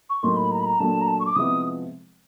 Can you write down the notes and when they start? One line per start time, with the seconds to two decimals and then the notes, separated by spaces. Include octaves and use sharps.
0.10 C#6
0.23 A2 F#3 A#3 D#4 C6
0.37 B5
0.51 A#5
0.60 B5
0.65 A#5
0.79 A#2 F#3 A3 D4 A5
1.01 A#5
1.08 A5
1.20 C#6
1.26 D6
1.35 C3 F3 G#3 B3 E4 D#6